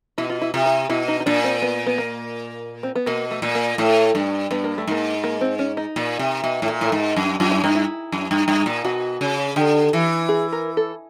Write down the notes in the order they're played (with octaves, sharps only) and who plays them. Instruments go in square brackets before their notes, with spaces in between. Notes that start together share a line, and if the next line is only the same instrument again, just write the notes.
[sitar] B2 [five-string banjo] E4
[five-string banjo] F4
E4
[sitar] C3 [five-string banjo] F4
[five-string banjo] E4
[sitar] B2 [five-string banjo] E4
[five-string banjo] D#4
D#4
[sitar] A#2 [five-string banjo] D4
[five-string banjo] C4
B3
B3
A#3
C4
B3
[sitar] B2 [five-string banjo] A#3
[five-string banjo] A3
[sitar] A#2
[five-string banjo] A#3
[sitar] A2 [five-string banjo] A3
[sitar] G2
[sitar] G2 [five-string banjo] B3
[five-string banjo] A#3
A3
[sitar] G#2 [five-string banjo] A#3
[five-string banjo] A#3
C4
C#4
D#4
[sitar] A#2
C3
B2
A2
A#2
A2
G#2
F#2
[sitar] F#2 [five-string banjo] F4
[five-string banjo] E4
[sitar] G2 [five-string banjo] D#4
[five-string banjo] E4
[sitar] F#2
G2
G2
A#2
[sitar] B2 [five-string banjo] F#4
[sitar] C#3
[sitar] D3 [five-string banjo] G4
[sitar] E3
[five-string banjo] G#4
A#4
A4